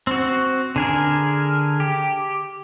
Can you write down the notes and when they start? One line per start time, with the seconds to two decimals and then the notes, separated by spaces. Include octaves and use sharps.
0.07 C4 F#4
0.76 D3 G#4 A#4
1.80 G4